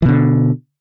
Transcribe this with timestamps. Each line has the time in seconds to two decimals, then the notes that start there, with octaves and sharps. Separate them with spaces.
0.02 E3
0.05 B2
0.08 D3